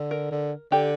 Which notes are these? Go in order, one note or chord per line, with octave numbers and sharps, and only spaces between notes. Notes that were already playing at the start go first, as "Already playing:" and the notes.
Already playing: D3
A#4
D3
D3 G4